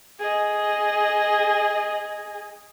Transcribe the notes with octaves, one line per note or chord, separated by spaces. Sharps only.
G#4 D#5